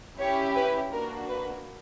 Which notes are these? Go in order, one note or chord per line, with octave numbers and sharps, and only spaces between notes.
C#4 E4 G4 C#5
B4
A#3 D4 F#4 A#4
B4